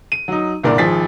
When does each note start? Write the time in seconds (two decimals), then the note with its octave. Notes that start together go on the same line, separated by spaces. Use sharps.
0.12 D#7
0.28 F#3 D#4
0.63 C2 G2 A#2 D3 A#4 D5
0.78 G#1 F3 G#4 A6 B6